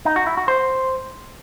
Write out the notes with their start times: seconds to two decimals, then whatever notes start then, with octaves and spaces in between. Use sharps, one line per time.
0.05 D#4
0.16 F#4
0.27 E4
0.37 F#4
0.48 C5